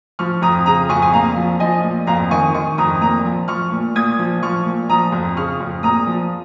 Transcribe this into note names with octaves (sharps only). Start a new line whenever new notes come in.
F3 C#6 F6
F2 A#5 D#6
C#3 A#5 D#6
F2 G#5 C#6
G#5
A#2 F5 A#5
F3
F3 D#5 G#5
A#2
F2 F5 A#5
D#3 G#5 C#6
D#3 G#5 C#6
F2 A#5 D#6
A#2 A#5 D#6
F3
F3 C#6 F6
A#2
A#2 D#6 G#6
F3
F3 C#6 F6
A#2
F3 A#5 D#6
F2
C#3 C#6 F6
F2
A#2 A#5 D#6
F3